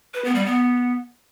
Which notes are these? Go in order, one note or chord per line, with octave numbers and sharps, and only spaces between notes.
B4
B3
G3
B3